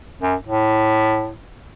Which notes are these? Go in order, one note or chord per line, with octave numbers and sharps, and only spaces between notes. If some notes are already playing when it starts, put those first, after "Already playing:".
F#2
A2